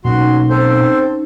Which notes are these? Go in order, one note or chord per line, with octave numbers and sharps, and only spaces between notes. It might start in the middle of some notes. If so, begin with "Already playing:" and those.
B2 F#3 A#3 C#4 D#4 F#4 C6
C4 A4 C5